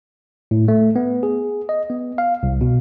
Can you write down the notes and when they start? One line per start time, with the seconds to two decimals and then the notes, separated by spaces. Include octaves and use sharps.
0.51 A2
0.68 A3
0.96 B3
1.23 G#4
1.69 D#5
1.90 B3
2.18 F5
2.43 C2
2.61 B2